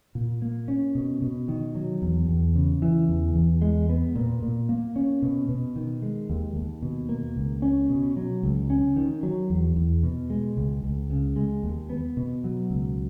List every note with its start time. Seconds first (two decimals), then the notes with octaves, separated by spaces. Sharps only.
0.15 A#2
0.42 A#3
0.68 C#4
0.95 B2
1.22 B2
1.48 D#3
1.75 F#3
2.02 E2
2.28 E2
2.56 C#3
2.82 E3
3.08 E2
3.35 E2
3.62 G#3
3.89 B3
4.15 A#2
4.42 A#2
4.69 A#3
4.96 C#4
5.22 B2
5.49 B2
5.76 D#3
6.02 G#3
6.30 D#2
6.56 D#2
6.82 B2
7.09 A#3
7.36 C#2
7.62 C#4
7.89 B2
8.16 F#3
8.43 C#2
8.70 C#4
8.96 D#3
9.23 F#3
9.50 E2
9.76 E2
10.03 B2
10.30 G#3
10.57 C#2
10.84 C#2
11.10 C#3
11.36 G#3
11.63 D#2
11.90 B3
12.17 B2
12.44 F#3
12.71 C#2